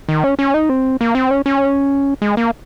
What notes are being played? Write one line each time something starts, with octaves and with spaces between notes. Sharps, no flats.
D#3
C#4
C#4
D#4
C4
A#3
C4
C#4
C#4
G#3
A#3